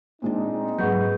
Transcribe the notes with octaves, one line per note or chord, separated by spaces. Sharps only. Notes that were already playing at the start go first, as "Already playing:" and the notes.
A#2 G#3 C4 D4 D#4
G#2 F#3 G#4 B4 F#5 C#6 G6